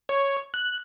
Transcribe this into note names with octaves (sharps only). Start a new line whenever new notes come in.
C#5
F#6